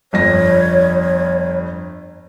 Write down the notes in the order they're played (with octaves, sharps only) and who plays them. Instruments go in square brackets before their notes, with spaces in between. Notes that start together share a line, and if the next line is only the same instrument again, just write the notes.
[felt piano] G1 F2 A#6 [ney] C#5